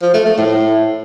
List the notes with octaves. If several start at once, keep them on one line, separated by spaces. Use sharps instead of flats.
F3
A3
A3
A2